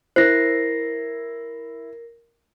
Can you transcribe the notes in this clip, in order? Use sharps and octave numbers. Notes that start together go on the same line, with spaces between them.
E4 A#4 C5 A#6 C7